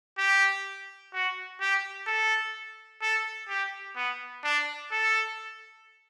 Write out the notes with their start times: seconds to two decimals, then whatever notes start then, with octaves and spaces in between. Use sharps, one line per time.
0.18 G4
1.13 F#4
1.61 G4
2.07 A4
3.02 A4
3.49 G4
3.96 B3
4.44 D4
4.92 A4